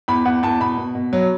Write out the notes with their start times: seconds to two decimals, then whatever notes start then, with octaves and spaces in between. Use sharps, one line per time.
0.08 E2 B5
0.25 E2 F#5
0.43 E2 A5
0.60 B2 B5
0.78 B2
0.95 B2
1.13 F#3